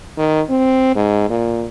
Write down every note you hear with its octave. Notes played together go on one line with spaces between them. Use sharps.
D#3
C4
G#2
A#2